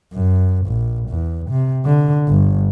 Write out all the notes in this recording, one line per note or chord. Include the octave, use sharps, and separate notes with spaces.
F#2
A#1
E2
C3
D3
G1